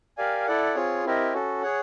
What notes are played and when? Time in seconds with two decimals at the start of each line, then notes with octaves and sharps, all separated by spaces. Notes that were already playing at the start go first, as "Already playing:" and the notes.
0.17 G4 A#4 D5 F5 G#5
0.46 E4 A4 D5 F#5
0.75 C4 F4 G#4 C#5
1.05 C4 E4 G4 A#4 D#5
1.33 C#4 F#4 A4
1.62 G#4 C#5 F#5